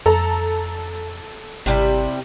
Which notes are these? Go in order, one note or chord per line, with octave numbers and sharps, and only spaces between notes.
F2 A4 A#5
G#1 C3 G3 E4